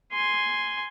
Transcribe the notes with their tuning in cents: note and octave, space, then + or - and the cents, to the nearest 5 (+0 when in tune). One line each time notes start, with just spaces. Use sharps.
G#5 +0 C6 +0